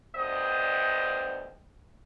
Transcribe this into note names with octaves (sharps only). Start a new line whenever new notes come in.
D2 G2 G3 B3 C5 D#5